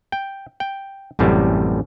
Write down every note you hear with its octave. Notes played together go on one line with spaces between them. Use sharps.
G5
G5
A1 F#2 A2 C3 G3